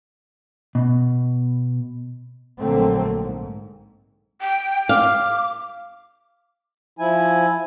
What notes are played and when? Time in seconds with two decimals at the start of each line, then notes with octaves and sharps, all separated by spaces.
0.75 B2
2.61 A#1 D3 F#3 A3 A#3 C4
3.20 G#2
4.41 G5
4.89 F5 D6
6.99 F3 E4 G#5